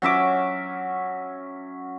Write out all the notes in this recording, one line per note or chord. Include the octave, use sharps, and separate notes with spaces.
F#3 C#4 E5 D6